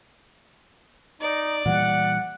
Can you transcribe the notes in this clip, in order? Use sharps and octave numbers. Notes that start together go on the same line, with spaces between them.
D#4 D5
A#2 E3 G3 F#5